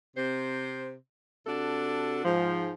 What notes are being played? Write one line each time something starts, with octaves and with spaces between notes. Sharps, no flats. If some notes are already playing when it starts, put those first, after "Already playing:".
C3 C5
C3 D4 F#4 A4
G#2 F3